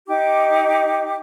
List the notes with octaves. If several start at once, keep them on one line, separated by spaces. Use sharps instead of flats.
D#4 G4 D6